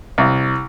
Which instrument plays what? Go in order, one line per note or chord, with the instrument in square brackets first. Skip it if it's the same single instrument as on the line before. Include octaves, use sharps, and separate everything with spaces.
[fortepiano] C2